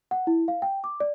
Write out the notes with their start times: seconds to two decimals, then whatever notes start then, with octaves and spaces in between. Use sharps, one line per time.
0.11 F#5
0.27 E4
0.48 F5
0.62 G5
0.84 D6
1.00 D5